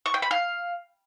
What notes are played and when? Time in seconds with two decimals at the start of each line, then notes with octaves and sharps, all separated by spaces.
0.06 C#6
0.14 G5
0.22 B5
0.31 F5